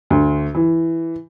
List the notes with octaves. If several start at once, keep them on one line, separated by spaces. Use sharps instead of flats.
D2
E3